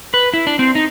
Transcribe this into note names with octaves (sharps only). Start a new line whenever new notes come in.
B4
E4
D4
C4
D#4